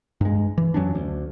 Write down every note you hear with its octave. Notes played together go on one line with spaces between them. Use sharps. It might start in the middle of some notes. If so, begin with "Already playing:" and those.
G2 G#3
E3
F2 F#3 C#4 D4
D2